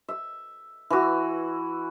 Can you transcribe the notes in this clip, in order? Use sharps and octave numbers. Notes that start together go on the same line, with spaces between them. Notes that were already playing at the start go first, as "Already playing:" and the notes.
E5
E3 F#4